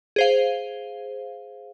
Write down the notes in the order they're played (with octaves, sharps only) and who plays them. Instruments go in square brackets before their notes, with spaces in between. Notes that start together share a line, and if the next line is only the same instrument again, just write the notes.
[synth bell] G#4 C5 F5